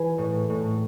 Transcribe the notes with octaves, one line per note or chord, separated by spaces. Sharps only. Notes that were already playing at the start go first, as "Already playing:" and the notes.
Already playing: E3 G#4 B4
A2
A2